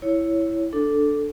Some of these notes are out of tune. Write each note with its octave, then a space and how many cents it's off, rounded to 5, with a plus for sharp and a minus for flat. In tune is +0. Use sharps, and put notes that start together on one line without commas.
E4 +0 C#5 +5
D4 +0 A4 +0